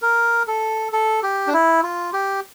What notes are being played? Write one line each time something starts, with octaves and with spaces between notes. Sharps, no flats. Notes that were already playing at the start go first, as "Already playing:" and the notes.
A#4
A4
A4
G4
D4
E4
F4
G4